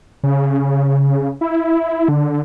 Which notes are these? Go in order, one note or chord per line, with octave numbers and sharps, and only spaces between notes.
C#3
E4
D3